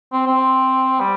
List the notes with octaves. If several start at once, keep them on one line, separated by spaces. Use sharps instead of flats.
C4
C4
G3